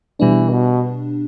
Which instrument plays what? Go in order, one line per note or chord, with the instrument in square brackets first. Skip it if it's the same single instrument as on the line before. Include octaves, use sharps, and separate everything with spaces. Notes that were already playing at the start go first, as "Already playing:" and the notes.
[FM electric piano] B2 G3 D4 [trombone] E3
[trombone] B2